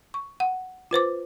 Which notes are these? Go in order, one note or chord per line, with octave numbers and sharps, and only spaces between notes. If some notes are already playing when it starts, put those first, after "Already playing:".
C#6
F#5
F4 B4 C5 D6